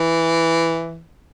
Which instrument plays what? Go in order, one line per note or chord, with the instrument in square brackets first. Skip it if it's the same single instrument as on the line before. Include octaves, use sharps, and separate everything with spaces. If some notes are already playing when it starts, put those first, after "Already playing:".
Already playing: [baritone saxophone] E3